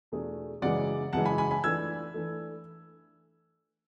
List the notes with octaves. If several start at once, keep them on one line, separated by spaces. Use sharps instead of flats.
E2 B2 A3 D4 G#4
F#2 C#3 E3 G#3 D5 F#5
F#2 C#3 E3 G#3 F#5 A5
G#5 B5
G#5 B5
G#5 B5
E3 A3 D4 A4 E6 G#6
E3 A3 D4 A4